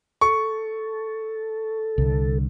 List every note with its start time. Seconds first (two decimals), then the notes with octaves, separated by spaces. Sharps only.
0.21 A4 C#6
1.98 C2 D3